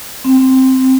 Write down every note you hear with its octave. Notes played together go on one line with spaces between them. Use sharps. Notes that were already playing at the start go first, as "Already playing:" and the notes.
C4